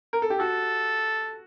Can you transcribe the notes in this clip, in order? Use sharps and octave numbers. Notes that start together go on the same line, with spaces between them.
A#4
A4
G4
F#4 A4